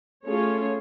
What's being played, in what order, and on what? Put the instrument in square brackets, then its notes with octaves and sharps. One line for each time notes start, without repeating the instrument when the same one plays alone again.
[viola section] A3 C#4 F4 G#4 C#5